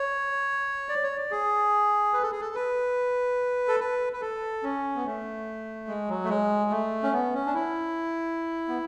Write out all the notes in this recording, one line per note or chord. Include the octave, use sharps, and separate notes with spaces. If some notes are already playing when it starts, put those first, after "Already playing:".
Already playing: C#5
D5
C#5
D5
G#4
B4
A4
G#4
A4
B4
A4
B4
B4
A4
C#4
B3
A3
G#3
F#3
A3
G#3
A3
C#4
B3
C#4
D4
E4
B3